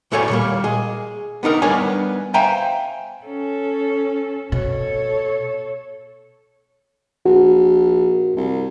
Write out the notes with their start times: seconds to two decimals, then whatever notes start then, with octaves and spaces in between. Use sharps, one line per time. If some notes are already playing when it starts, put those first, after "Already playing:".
0.12 B1 A2 A4 C#5 D5 G#5
0.30 A#2 G3 A#3
0.64 G#4 D#5
1.43 B3 D4 D#4 A#4
1.62 G3 B3 D4 A#4 C#5 G#5
2.34 C5 E5 F5 G5 G#5 A#5
3.25 C#4 A4
4.52 B2 A4 C#5
7.26 A#1 F#4
8.36 C2